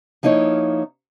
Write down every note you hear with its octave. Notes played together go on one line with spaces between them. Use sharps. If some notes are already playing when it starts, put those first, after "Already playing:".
F3 A#3 D#4 E4 C#5